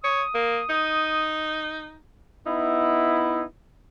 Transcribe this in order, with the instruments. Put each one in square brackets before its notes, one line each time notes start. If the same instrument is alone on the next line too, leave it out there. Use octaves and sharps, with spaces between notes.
[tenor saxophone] C#5 [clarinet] D#6
[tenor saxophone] A#3
D#4
[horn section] B3 D#4 E4